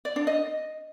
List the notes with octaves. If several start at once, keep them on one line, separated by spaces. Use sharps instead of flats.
D5
D4
D#5